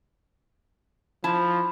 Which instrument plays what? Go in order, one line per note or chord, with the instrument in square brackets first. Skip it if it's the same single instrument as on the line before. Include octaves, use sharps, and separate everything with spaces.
[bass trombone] F3 [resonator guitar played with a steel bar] E4 A5 [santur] B5